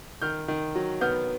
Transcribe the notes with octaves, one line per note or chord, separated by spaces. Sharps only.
D#3 F6 G6
D#3
F#3
B3 F6 G6